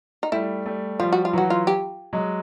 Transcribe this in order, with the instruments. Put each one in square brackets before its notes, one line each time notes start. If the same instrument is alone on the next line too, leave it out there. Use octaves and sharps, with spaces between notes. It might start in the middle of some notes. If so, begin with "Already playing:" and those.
[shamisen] D#4
[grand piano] G3 A3 [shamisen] E4
[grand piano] G3 A3
[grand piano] F3 G3 [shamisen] F4
[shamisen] F#4
F4
[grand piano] E3 F#3 [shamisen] F#4
[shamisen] F4
G4
[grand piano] F#3 G#3